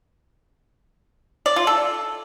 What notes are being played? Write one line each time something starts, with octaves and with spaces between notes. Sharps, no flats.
D5
F4
A4